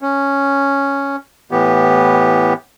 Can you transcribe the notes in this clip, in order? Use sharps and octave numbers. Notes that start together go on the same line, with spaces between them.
C#4
A2 E3 B3 G4